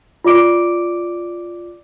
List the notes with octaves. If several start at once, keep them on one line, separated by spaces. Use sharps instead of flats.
F4 D5 D6 D7